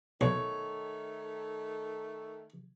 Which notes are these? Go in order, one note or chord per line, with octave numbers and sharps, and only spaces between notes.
B1 D#3 A3 C#5